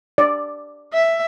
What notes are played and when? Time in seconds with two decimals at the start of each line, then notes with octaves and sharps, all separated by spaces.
0.18 D5
0.93 E5